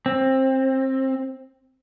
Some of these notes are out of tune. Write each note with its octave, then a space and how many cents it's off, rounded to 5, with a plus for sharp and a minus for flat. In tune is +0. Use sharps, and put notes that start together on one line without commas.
C4 +20